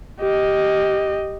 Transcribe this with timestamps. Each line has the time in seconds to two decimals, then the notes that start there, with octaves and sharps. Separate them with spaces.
0.20 G4 D#5